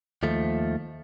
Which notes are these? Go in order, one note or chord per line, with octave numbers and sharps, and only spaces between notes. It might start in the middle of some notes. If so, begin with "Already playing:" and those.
D#2 F3 A3